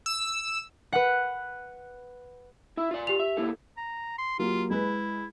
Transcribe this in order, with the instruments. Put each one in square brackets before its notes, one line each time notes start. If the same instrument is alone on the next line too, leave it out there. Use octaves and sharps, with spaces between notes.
[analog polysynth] E6
[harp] B4 F#5
[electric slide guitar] E4 E5
F4 D5
[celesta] G4 F7
[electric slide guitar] E5
A#3 E4 A4
[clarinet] A#5
C6
[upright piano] F#3 A#3 G4 [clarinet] F4
[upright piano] G#3 B4 [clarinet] E4